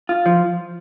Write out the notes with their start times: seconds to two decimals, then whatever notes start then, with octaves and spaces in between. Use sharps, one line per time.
0.09 F4
0.26 F3